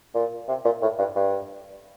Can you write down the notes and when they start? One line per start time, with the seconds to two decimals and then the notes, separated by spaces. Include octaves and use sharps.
0.14 A#2
0.48 C3
0.65 A#2
0.82 A2
0.99 G2
1.16 G2